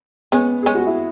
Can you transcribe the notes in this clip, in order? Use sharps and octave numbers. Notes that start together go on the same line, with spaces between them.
G#3 B3 C#4
G#3 C#4 G#4
F#4
E4